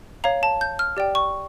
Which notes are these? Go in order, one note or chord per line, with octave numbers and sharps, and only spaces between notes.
C#5 F5 A#5
A5
G6
F6
G4 D5 G5
C#6